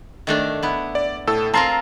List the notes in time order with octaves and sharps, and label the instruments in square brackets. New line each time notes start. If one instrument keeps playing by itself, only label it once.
[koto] D#3 A3 D4
B3 E4
[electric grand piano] D5
A2 A4 E6
[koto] C4 F4 A#4 [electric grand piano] A5 A#5 C7